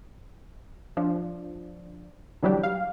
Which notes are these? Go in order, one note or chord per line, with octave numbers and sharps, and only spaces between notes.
F3 D4
D3 E3 F#3 G3 D4 G4
F5